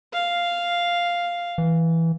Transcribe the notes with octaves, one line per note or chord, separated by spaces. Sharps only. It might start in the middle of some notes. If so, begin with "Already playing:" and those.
F5
E3